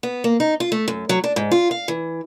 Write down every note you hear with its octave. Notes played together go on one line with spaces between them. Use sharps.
B3
A#3
D#4
F4
A3
F#2
F#3
D4
G#2
F4
F5
E3